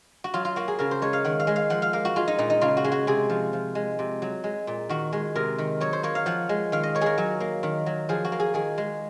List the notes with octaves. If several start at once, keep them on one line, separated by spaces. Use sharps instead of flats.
F#4
F#3 F4
F4
A#3 F#4
G#4
C#3 A#4
C5
G#3 C#5
F5
D#3 F#5
F5
G#3
F5
F3 F#5
F5
A#3 F5
F#4
G#3 F4
D#4
A#2 D#4
D#4
C#3 F4
F#4
G#3
F#4
C3 G#4
F3
F3
G#3
C3
F#3
G#3
A#2
D#3 F#4
G#3
C3 A#4
D#3
F#3 C#5
C5
A#3 C#5
F5
F3 F#5
G#3
D#3 F5
D#5
A#3 C#5
G#4 A#4
F#3
A#3
D#3
F#3
F3 G#4
F#4
A#3
G#4
D#3 G#4
G#3